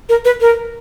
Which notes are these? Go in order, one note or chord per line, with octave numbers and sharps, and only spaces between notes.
A#4
B4
A#4